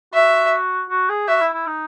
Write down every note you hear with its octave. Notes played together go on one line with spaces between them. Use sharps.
F#4 E5
F#4
G#4
F#4 E5
E4
E4
D#4